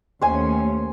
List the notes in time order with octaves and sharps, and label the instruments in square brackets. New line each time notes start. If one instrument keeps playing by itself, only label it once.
[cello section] D#2 A3 C#4 [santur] C5 G#5